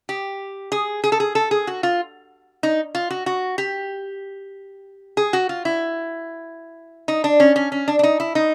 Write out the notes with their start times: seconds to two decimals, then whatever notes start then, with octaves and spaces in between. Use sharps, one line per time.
0.09 G4
0.72 G#4
1.04 G#4
1.12 A4
1.20 G#4
1.35 A4
1.51 G#4
1.67 F#4
1.83 F4
2.63 D#4
2.95 F4
3.10 F#4
3.26 F#4
3.58 G4
5.17 G#4
5.33 F#4
5.49 F4
5.65 E4
7.08 D#4
7.24 D4
7.40 C#4
7.56 C#4
7.72 C#4
7.88 D4
7.99 D4
8.03 D#4
8.20 E4
8.35 D#4